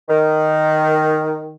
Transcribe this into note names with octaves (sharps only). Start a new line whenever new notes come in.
D#3